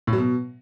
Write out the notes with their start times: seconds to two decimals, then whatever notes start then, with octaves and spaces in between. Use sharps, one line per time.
0.07 A2
0.13 F#3
0.18 B2